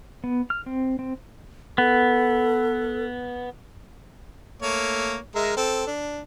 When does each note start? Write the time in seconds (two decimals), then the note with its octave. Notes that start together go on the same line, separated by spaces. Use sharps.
0.24 B3
0.50 F6
0.66 C4
0.99 C4
1.78 B3 A4
4.62 A3 A#3 C#5
5.35 G#3 A#4 E5
5.57 C4 A4
5.87 D4